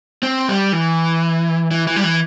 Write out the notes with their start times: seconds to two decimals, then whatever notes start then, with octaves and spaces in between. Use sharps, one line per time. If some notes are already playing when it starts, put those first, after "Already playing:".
0.23 C4
0.49 G3
0.72 E3
1.71 E3
1.87 E3
1.96 G3
2.04 E3